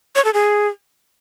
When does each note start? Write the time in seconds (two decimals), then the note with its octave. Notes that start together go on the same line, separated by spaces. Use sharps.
0.16 C#5
0.25 A4
0.34 G#4